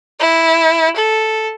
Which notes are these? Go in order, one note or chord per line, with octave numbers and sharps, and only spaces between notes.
E4
A4